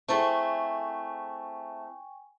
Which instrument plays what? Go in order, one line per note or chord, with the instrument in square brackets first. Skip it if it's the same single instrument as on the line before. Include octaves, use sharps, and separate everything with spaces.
[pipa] A3 A4 [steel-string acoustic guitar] C4 E4 G#4 [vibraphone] G5 G#5 C#6